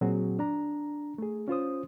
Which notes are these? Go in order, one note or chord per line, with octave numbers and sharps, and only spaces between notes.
A#2 F#3 C4 F#4 G#4
D4 A#5
A3 G#4
C#4 F4 C5 D#6